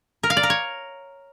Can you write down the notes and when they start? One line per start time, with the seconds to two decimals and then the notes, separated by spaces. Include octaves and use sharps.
0.23 A#4
0.30 F5
0.37 D5
0.43 A#4
0.50 C#5